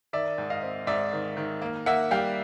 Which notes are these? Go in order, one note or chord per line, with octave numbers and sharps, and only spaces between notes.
D#3 D5 E5
G#2
D#5 F5
C4
G#2 D5 E5
D#3
D#3
A#3
A#3 E5 F#5
G3 F5 G5